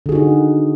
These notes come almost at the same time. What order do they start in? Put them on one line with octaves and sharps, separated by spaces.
D3 G#4 F#4 D#4